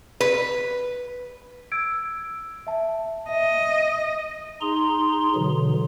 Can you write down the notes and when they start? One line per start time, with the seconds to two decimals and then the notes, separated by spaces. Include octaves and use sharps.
0.20 B4
1.72 E6 G#6 D7
2.67 E5 A5
3.29 D#5 E5
4.61 D#4 G#4 A#5 C6
5.35 B2 D3 E3 F#3